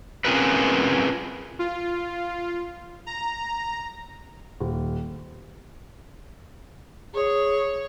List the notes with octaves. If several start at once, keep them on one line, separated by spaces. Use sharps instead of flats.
C4 C#4 F4 G#4 A#4 B4
F4
A#5
D#1
G#4 C#5 C#6